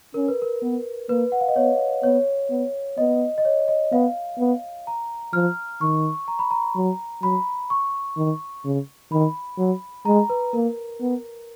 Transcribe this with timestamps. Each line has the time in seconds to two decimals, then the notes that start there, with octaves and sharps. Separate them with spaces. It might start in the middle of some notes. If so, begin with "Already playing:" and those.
0.14 C#4 A#4
0.28 B4
0.42 A#4
0.62 B3
1.09 A#3 B4
1.32 F#5
1.41 F5
1.48 D#5
1.56 B3 C#5
2.04 B3 C#5
2.50 B3
2.98 B3 D#5
3.38 D#5
3.45 C#5
3.68 D#5
3.92 B3 F5
4.39 B3
4.87 A#5
5.33 F3 F6
5.81 D#3 C#6
6.28 A#5
6.39 B5
6.51 A#5
6.76 F#3
7.22 F#3 B5
7.70 C#6
8.17 D#3
8.65 C#3
9.11 D#3 B5
9.58 F#3
10.05 G#3 A#5
10.30 B4
10.53 A#3 A#4
11.01 B3